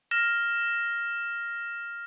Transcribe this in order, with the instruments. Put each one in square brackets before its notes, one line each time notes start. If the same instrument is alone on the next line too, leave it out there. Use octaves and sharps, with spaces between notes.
[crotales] F6 A#6 E7